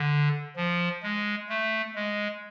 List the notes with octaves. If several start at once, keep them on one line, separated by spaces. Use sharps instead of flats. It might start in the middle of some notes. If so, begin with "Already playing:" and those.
Already playing: D3
F3
G#3
A3
G#3